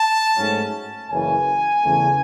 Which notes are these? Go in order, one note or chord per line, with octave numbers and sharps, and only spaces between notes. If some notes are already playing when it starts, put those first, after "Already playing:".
Already playing: A5
G#2 F#3 A3 C#4
F#1 F#2 C#3 E3 G#5
E2 C#3 F#3 A3 C#4